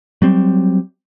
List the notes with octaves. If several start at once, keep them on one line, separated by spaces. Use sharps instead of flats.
F#3 G3 C4